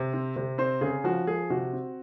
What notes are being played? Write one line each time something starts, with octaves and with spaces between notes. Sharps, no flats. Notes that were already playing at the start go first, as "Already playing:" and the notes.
Already playing: C3
C4
C3
C4 C5
C#3 G#4
F3 F#4
F3 G#4
C3 F#4
C4